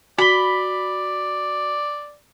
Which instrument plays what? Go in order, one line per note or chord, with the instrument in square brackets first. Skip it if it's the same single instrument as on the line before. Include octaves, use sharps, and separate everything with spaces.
[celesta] F#4 G7 [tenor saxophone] D5 [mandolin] B5